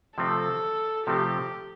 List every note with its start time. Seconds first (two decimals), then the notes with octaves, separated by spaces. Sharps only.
0.17 C3 F3 A3 C4 A4
1.07 C3 F3 A3 C4 G4